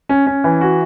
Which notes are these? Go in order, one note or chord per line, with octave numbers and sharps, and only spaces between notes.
C#4
C#4
E3
F#4